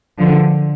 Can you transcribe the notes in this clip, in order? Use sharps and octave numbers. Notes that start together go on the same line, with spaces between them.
D3 F3